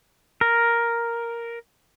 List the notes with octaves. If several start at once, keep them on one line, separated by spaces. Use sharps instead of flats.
A#4